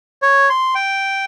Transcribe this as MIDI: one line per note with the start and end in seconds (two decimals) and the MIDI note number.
0.22 0.49 73
0.50 0.74 84
0.75 1.25 79